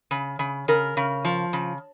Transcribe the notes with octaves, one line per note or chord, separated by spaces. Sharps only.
C#3
C#3
C#3 A#4
C#3
F3
C#3